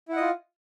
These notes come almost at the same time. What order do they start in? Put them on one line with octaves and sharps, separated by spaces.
E4 F#5 D#5 F4